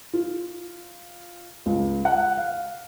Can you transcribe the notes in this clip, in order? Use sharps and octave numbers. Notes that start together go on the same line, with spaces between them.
F4
C#2
F#5
F5